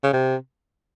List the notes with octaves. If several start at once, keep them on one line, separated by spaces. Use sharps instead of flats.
C#3
C3